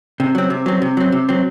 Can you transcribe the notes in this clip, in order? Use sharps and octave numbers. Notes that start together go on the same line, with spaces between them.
C3
F#3 C4
C3
F#3 C4
C3
F#3 C4
C3
F#3 C4